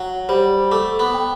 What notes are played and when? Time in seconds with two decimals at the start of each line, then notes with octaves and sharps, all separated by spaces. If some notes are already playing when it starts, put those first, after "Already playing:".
Already playing: F#3 F#5
0.29 G3 C5
0.72 A3 D6
0.99 B3
1.14 G5